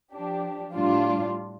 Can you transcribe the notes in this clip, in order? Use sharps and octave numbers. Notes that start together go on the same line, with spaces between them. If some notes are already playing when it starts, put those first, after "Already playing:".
F3 D4 G4
A2 G3 D4 F4